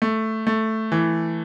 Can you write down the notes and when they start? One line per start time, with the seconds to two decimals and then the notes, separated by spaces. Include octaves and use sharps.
0.02 A3
0.47 A3
0.92 E3